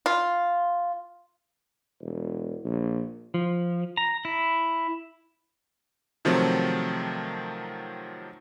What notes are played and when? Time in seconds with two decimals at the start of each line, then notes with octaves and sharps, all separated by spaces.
0.06 F4
2.01 E1
2.64 A#1
3.34 F3
3.97 A#5
4.25 E4
6.25 C3 D#3 F3 F#3 A3 C4